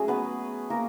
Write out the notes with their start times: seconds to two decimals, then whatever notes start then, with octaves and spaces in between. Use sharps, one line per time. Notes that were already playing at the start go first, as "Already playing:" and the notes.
Already playing: F#3 A3 C#4 G#4
0.08 B3 B4
0.70 A#3 A#4